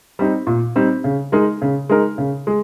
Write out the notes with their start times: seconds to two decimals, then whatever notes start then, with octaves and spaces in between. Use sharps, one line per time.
0.19 G3 C4 D#4
0.47 A#2
0.76 G3 C4 D#4
1.04 C#3
1.32 G#3 D#4 A#4
1.62 C#3
1.89 G#3 D#4 A#4
2.18 C#3
2.47 G#3